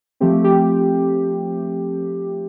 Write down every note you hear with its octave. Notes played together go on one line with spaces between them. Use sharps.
F3 A3 C4 G4
G4